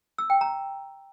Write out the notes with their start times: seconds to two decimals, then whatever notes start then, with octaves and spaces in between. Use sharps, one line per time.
0.18 E6
0.30 G5
0.41 A#5